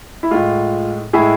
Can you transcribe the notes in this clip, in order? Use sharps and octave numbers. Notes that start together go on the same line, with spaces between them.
E4
A2 G#3 F4
A2 G#3 E4 G#4